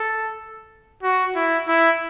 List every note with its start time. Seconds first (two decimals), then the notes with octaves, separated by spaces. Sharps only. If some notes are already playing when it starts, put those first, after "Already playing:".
Already playing: A4
1.03 F#4
1.36 E4
1.68 E4